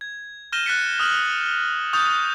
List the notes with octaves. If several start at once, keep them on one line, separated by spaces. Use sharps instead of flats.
G#6
F6 G6 A#6 D#7 E7 G7
F#6 A6 B6 C#7
D#6 F6 F#7
C#6 D#6 G6 A6 F7